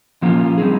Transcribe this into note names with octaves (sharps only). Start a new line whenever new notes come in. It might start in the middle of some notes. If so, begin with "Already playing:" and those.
A#2 F3 A#3 C#4 F4
G3 C4 D#4 G#4